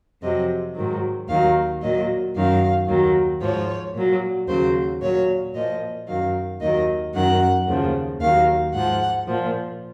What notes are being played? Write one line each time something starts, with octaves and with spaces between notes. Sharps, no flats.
F2 C3 F#3 D#5
G#2 D#3 F#3
D#2 D#3 F#3 F5
A#2 F#3 D#5
F#2 D#3 F#3 F5
D#2 D#3 F#3
G#2 F3 C#5
A#2 F#3
D#2 C#3 F#3 C5
A#2 F#3 C#5
A#2 F3 D#5
F#2 D#3 F#3 F5
D#2 D#3 F#3 D#5
F#2 D#3 F#3 F#5
D#2 C#3 F3
D#2 D#3 F#3 F5
G#2 F3 F#5
A#2 F3